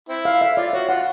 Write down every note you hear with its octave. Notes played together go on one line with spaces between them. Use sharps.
C4 E4
F5
E5
F4 D5
F#4 C#5
F4 F#5